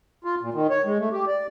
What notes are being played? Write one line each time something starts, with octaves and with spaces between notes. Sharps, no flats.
F4
A#2
D#3
C#5
G#3
A3
G4
D5